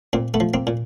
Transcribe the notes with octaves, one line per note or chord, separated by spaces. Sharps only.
A#2 A#3 C4
A3 B3
F3
A#3 C4
A#2